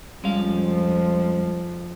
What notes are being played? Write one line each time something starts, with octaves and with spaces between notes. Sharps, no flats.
F2 F3 G3 G#3 C#4 F5